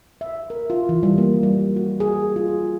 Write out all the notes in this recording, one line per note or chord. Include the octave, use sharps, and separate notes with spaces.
E5
A#4
F4
E3
G3
A#3
G3
F#4
G#4
F4